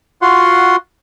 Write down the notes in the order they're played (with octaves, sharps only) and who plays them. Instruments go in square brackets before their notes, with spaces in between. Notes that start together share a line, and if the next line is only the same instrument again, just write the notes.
[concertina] F4 F#4 F#5 C6